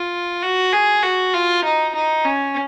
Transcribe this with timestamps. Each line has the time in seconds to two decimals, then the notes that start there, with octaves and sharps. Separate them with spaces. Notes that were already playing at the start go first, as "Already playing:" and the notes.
Already playing: F4
0.42 F#4
0.73 G#4
1.03 F#4
1.33 F4
1.64 D#4
1.95 D#4
2.25 C#4